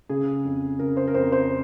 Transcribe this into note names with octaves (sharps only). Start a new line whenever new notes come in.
C#3 G#4
F2
C#3 A#4
C5
A#4
F2 C5
C5